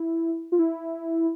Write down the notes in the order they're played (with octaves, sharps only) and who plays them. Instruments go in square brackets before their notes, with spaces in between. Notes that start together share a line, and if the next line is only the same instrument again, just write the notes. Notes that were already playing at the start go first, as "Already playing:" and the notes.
Already playing: [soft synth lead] E4
F4
E4